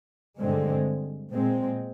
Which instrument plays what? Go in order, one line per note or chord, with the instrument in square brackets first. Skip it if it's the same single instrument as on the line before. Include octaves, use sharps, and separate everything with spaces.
[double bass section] G2 D3 G#3 C4
A#2 G#3 C4